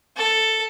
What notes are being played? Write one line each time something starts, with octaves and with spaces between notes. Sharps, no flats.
A4